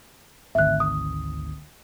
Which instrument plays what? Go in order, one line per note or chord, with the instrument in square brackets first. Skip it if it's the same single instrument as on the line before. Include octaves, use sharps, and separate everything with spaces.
[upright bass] G#1 D2 [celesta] E5 F#6
[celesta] D#6